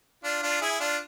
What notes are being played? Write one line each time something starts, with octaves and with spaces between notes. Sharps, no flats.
D4 F4
D4 F4
E4 G#4
D4 F4